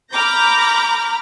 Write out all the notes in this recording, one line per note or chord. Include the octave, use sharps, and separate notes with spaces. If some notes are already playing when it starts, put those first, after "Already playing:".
A#5 B5 D6 F6 G6 A#6